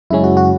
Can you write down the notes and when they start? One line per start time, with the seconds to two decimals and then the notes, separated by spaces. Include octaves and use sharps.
0.10 F#2 C#3 G#3 C#4 E4
0.24 F#4
0.37 F#4